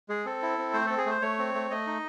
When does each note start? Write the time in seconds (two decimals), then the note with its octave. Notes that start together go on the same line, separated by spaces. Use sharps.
0.09 G#3 G#4
0.25 C4 A4
0.42 E4
0.58 C4
0.73 A3 C5
0.86 C4 A4
0.98 G#4
1.06 A3 C5
1.22 A3 C#5
1.39 C4
1.54 A3
1.71 A3 D#5
1.87 D#4